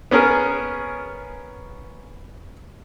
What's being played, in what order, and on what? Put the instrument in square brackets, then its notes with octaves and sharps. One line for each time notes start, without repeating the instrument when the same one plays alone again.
[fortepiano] B3 C#4 G#4 A#4